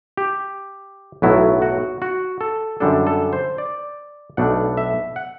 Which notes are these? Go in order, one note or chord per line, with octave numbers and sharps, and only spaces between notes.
G4
B1 A2 F#3 B3 E4
F#4
F#4
A4
F#2 D3 G3 D4 A4
A4
C5
D5
B1 B2 A3 D4 F#5
E5
F#5